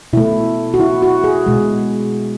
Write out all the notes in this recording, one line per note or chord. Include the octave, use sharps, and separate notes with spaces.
B2 A3 E4
F#4
E4
F#4
G#4
B2 G#3